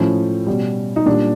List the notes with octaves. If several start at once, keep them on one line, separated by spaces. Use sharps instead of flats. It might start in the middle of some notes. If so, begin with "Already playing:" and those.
Already playing: A2 F3 C#4
B2 G3
D#4
A#2 G3 D4